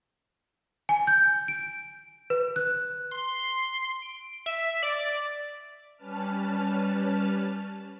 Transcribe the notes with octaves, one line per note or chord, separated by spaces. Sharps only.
G#5
G6
D7
B4
F#6
C6
D7
E5
D5
G3 C#4 B4 A5 F6